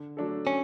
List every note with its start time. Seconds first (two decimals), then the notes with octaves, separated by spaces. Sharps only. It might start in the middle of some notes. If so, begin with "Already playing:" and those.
Already playing: D3
0.17 F#3 A3 D4 A4
0.47 C#4